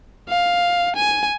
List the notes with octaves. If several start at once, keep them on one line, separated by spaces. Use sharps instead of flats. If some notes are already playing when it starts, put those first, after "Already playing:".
F5
G#5